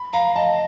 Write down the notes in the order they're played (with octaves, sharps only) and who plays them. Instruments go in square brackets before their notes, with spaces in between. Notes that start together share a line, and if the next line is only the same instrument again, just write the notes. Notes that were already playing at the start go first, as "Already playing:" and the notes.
Already playing: [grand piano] B5
[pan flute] F5 [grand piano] A#5
[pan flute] D#5 [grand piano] A5